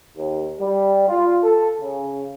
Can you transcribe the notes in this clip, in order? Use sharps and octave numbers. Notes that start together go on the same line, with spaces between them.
D#2
G3
F4
A4
C#3